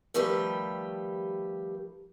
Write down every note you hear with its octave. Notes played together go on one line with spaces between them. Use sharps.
D#3 F3 G3 A3 G4 B4